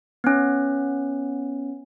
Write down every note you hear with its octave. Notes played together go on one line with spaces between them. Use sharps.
B3 C#4